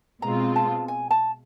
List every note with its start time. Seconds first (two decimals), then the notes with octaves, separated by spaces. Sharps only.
0.22 B2 G#3 C4 F4 A#5
0.56 A5
0.88 G#5
1.11 A5